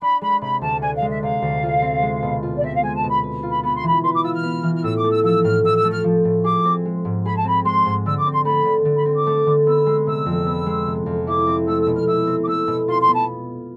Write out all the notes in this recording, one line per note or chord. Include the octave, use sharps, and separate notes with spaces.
D4 B5
G#3 B5
C3 B5
D2 A5
D4 G#5
F5
G#3
E5
C3 F5
D2
F4
C4
G#3
B2
F4
D5
C4 E5
F5
G#3 G#5
A5
B2
B5
B4
F4
B5
B3 B5
C6
E3 B5
B4 C6
D6
F4 E6
F6
B3
E3
F6
A2 E6
D6
A3
E6
F3 E6
A2 F6
A2 E6
E6
A3
F6
F3
A2
G#4 D6
C4
G#3
G#2
G#4 B5
A5
C4 B5
G#3 C6
G#2
D3 E6
D6
C4
C6
A3 B5
D3
D3
B5
C4
D6
A3
D3
B3 E6
G#3
C3 E6
F2
B3
G#3
C3
F2
E4 D6
C4
A3 E6
E6
B2
F6
E4 E6
C4
D6
A3 E6
B2
F4 C6
C6
B3
A5